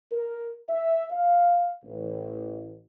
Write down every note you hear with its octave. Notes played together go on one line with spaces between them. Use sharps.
A#4
E5
F5
A1